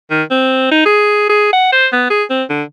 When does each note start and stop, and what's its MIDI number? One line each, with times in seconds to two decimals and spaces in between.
0.10 0.23 51
0.30 0.70 60
0.71 0.83 63
0.85 1.28 68
1.29 1.50 68
1.53 1.68 78
1.72 1.87 72
1.92 2.05 59
2.10 2.23 68
2.30 2.43 60
2.49 2.63 50